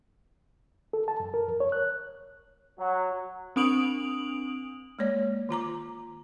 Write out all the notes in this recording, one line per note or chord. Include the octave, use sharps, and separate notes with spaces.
A4
A5
F#2
A#4
F2
C#5
F#6
F#3
C4 D4 D#6 D7 F7 F#7
G#3 A#3 C#5 D5
D#3 F4 A#5 D6